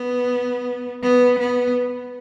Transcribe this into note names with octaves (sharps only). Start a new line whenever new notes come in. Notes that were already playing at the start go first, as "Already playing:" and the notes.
Already playing: B3
B3
B3